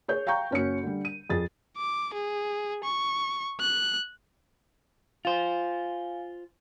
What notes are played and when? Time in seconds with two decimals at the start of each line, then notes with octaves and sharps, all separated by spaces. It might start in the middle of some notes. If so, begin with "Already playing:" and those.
0.08 G#4 C#5 G6
0.27 F5 G5 A#5 C#6 G6
0.51 F#1 C#4 F#4 C#7
0.83 D3 G3
1.05 D#7
1.30 F2 G#4 A6
1.77 D6
2.14 G#4
2.84 C#6
3.61 F#6
5.25 F4 C5 F5 G#5